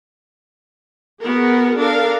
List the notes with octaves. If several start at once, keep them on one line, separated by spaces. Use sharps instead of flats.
B3 F#4 G#4 A#4
D4 A4 A#4 F5